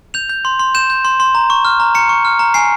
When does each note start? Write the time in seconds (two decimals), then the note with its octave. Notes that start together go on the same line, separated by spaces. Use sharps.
0.14 G6 F7
0.29 G6
0.45 C6
0.59 C6
0.75 G6 E7
0.90 G6
1.05 C6
1.20 C6
1.35 A#5
1.50 C#6
1.65 F6
1.80 A#5
1.95 A#5 C#7
2.09 C#6
2.25 F6
2.39 A#5
2.54 G#5 C7